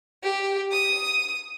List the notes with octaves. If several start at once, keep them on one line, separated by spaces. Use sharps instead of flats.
G4
D#6